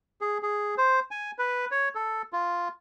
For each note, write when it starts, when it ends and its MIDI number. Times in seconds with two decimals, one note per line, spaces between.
0.21 0.38 68
0.43 0.75 68
0.78 1.00 72
1.11 1.31 80
1.38 1.65 71
1.71 1.89 73
1.95 2.22 69
2.33 2.68 65